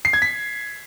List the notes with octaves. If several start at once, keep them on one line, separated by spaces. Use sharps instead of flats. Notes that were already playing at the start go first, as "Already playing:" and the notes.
C7
G#6
B6